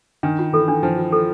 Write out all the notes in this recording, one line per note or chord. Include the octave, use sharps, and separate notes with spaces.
D#3 D4
F4
E3 A4
D4
F3 D4
F4
A4